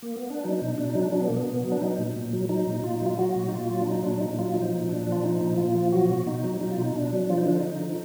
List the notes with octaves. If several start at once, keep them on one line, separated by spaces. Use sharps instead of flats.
A#3
B3
D4
F#3 D#4
B2
B2 D4
D#4
F#3
D4
F#3 D4
B3
B2 A#3
B3
B2
F#3
D4
F#3 D#4
A#2
A#2
F#3
F#3 D#4
A#2
A#2 F4
D#4
F#3
F4
F#3 F#4
A#2
D#4
A#2 F4
F#3
D4
F#3 D#4
A#2 D4
D4
A#2 D#4
F#3 F4
F3 D#4
A#2
A#2 D4
F3
F4
F3 D#4
A#2
A#2 F4
F3
F#3 F#4
B2
B2 D#4
F#3
F#3 D#4
F4
B2 D#4
B2 D4
F#3
F3 F4
D#4
D3 D4
D#4
D3
F3